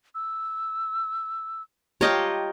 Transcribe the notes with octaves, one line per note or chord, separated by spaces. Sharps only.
E6
F4 G4 C#5 D#5 G5 A5 A#5